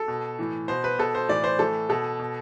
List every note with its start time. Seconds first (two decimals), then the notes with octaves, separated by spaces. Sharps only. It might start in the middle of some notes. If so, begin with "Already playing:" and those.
Already playing: A4
0.08 B2
0.39 A2 E3
0.68 B2 C5
0.84 B4
0.99 B2 A4
1.15 C5
1.29 A2 E3 D5
1.44 C5
1.59 A2 E3 A4
1.89 B2 A4
2.19 B2